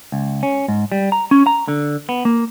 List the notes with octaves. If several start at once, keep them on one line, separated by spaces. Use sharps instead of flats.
C#2
C#4
G#2
G3
A#5
C#4
A#5
D3
B3
A#3